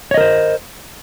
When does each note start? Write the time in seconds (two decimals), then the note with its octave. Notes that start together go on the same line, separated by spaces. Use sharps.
0.11 C#5
0.14 D#5
0.17 A#4
0.21 C5